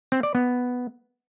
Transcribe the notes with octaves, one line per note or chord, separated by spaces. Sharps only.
C4
D5
B3